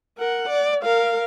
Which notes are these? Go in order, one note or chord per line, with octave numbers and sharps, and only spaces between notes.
A#4 F#5
D5
A#4 F5